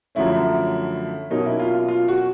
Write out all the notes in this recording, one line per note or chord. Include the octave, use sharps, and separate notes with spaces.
F#2 D3 F3 A3 C#4 E4
B2 F#3 A#3 C#4 D#4
E4
F4
F4
F4
F#4